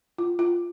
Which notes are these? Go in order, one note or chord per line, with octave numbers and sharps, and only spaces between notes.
F4
F4